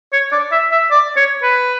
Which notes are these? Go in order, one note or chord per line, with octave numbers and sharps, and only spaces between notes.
C#5
D5
E5
E5
D5
C#5
B4